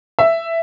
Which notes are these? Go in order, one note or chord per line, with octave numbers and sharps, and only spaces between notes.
E5